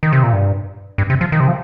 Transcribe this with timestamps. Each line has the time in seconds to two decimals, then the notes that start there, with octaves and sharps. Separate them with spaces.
0.03 D#3
0.13 C3
0.23 A#2
0.33 G2
0.98 G2
1.10 C3
1.21 F3
1.32 D#3
1.40 C3
1.48 F3